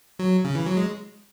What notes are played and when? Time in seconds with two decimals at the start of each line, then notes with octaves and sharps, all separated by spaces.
0.19 F#3
0.44 C#3
0.55 E3
0.66 F#3
0.77 G#3